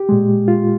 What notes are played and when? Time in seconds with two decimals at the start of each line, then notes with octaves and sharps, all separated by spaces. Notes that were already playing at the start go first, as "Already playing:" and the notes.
Already playing: G4
0.09 A#2 G#3
0.48 F4